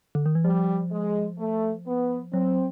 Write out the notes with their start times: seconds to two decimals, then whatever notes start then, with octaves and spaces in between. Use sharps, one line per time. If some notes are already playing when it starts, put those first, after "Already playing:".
0.15 D3
0.26 D#3
0.35 E3
0.44 F3 G3
0.92 G#3
1.39 A3
1.87 B3
2.33 F#3 C4